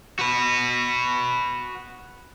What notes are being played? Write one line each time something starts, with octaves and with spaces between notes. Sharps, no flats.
F#4 B4